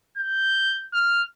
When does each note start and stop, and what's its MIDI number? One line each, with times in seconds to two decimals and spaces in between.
0.17 0.85 91
0.93 1.22 89